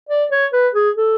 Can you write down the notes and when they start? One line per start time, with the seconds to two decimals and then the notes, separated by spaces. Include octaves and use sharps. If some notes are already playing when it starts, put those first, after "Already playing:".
0.09 D5
0.31 C#5
0.53 B4
0.75 G#4
0.97 A4